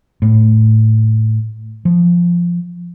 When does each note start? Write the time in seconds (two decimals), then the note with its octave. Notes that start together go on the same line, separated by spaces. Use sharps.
0.22 A2
1.85 F3